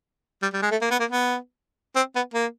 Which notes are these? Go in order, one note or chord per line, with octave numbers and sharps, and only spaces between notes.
G3
G3
G#3
A3
A#3
B3
A#3
B3
C4
B3
A#3